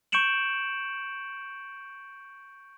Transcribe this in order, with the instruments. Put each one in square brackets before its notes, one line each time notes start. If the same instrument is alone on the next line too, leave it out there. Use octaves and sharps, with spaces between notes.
[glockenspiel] C#6 G6 C#7 D7 E7 F#7